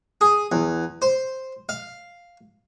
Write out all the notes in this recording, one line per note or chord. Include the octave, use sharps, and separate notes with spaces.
G#4
E2
C5
F5